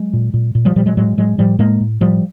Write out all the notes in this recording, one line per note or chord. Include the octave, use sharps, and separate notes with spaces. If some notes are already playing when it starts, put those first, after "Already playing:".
Already playing: F#3 G#3
A#2
A#2
A#2
F3 G3
A#2 F3 G3
F#3 G#3
A2 F#3 G#3
A2 F#3 G#3
A2 F3 G3
A2 G#3 A#3
A2
A2 F3 G3